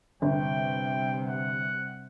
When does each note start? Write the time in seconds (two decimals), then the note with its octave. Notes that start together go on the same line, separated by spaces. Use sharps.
0.22 G1 C3 G3 G5
1.25 F#5